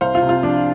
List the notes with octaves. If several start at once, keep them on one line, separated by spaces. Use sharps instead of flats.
C2 C5 F5
F4
C3
F4
F3 D4